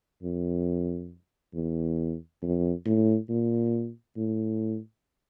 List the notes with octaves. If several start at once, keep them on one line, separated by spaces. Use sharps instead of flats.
F2
E2
F2
A2
A#2
A2